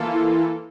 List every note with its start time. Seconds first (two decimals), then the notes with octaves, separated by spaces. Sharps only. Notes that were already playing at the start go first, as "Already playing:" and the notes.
Already playing: E3 A#3 F4 A4
0.10 E4